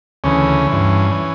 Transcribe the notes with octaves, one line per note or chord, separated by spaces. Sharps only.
D2 C#3 E3 C#4
E3
G2
E3